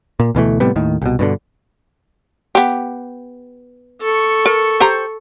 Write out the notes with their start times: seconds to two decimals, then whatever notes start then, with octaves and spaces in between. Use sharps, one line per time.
0.20 A#2
0.35 D2 B2 E3 A3
0.60 A2 C3 G3 B3
0.76 D#2 A2 D#3
1.02 C2 B2
1.19 G2 B2 D3
2.55 B3 G4
4.02 A4 C#6
4.46 A#4
4.80 G4 C5 A#5